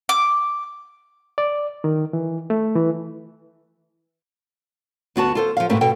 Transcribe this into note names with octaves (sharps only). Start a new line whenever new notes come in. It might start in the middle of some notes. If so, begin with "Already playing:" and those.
D6
D5
D#3
E3
A3
E3
D2 B3 F#4 A5
F4 A4 C5
F3 F5
G#2 B2 A3 C4 B4
B2 A4 G5